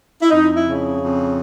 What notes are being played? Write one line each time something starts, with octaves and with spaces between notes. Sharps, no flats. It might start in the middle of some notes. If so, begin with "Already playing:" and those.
E4
F2 D#4
E4
C#3
F2